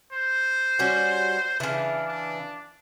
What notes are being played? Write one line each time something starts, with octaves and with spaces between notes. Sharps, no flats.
C5
G3 C#4 F#4
C#3 E3 D4
D4